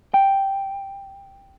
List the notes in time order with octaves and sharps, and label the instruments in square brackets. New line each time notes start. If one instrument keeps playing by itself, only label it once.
[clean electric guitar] G5